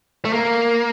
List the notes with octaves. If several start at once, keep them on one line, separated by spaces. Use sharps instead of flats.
A3
A#3